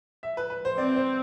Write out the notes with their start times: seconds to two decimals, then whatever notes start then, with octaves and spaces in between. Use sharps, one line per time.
0.23 E5
0.37 B4
0.50 B4
0.65 C5
0.78 C4 D5
0.96 C5